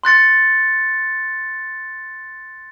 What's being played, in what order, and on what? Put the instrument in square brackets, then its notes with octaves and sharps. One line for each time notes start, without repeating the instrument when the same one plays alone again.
[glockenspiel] C6 F#6 A6 C#7